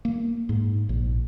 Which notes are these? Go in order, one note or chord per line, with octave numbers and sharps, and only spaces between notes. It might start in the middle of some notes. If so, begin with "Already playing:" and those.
A#3
G#2
A#1